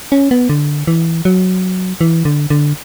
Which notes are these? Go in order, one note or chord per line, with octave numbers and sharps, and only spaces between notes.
C#4
B3
D3
E3
F#3
E3
D3
D3